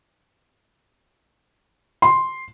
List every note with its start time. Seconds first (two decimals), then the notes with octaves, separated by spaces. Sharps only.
2.02 C6